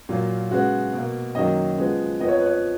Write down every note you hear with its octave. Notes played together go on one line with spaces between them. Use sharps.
A#2 F#3 A#3 F4
C#3 G#3 B3 F#4
B2 A#3
F#2 D#3 F#3 A#3 D#5
C#3 F3 G#3 B3
F2 F3 B3 D#5
C#5
B4
C#5